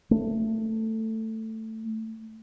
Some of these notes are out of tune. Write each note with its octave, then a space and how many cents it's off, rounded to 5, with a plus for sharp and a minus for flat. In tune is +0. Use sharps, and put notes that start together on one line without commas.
A3 +10